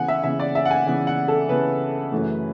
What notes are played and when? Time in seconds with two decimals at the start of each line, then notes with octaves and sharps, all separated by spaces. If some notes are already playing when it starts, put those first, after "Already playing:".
Already playing: C#3 E3 B3 F#5 G#5
0.08 E5
0.23 C#3 E3 B3 E5
0.39 D5
0.55 E5
0.65 F#5
0.71 G#5
0.86 C#3 E3 B3 F#5
1.07 F#5
1.28 A4
1.49 C#3 E3 B3 B4
2.12 F#2 C#3 E3 A3